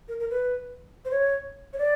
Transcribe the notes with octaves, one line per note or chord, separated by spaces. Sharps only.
A#4
A#4
B4
C5
C#5
C#5
D5